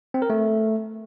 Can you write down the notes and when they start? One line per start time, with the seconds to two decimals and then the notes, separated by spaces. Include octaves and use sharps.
0.14 C4
0.22 A#4
0.30 A3